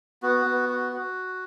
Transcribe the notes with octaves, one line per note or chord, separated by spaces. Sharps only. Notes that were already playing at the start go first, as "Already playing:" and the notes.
B3 F#4
B3
F#4
F#4